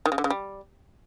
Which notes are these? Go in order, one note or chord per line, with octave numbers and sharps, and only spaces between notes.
D#3
C#3
D3
C#3
G3